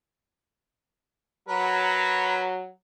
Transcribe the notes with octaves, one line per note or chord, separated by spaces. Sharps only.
F#3 A#4 B4